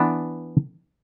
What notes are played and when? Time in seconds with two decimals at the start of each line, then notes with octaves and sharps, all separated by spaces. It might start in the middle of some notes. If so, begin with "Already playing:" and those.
Already playing: E3 B3 D4